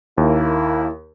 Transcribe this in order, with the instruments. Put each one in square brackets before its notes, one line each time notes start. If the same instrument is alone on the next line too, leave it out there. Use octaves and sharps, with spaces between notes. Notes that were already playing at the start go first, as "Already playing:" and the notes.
[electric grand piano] D#2 [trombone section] A#3 E4